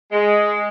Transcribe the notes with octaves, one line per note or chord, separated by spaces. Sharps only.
G#3